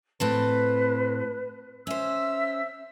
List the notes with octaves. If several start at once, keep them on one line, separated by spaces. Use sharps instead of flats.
A2 C4 B4 A5
C#4 C5 E5 E6